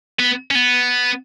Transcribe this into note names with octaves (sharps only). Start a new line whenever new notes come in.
B3
C#4
B3